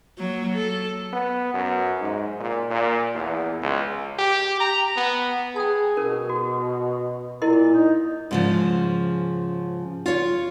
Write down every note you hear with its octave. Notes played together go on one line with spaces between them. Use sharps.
F#3 A#3
A4
B3
F#2
G#2
A#2
A#2
E2
C#2
G4
A#5
B3
G#4 G5 A5
B2 C#4 A#4
F#4
A#2 E4 A#4 D#5
D#4
G#2 C#3 F3
F4 C#5